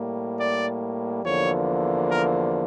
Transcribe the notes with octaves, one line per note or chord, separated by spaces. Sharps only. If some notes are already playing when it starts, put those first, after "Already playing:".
Already playing: A2 G3 A#3
D5
E2 D3 F3 A#3 C#5
A#4